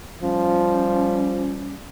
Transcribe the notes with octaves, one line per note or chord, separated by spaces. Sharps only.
F3 G3 C#4